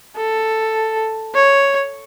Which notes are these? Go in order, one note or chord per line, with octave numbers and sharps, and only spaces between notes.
A4
C#5